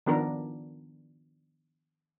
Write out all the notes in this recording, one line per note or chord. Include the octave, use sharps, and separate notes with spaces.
D#3 F3 B3 D4 A#4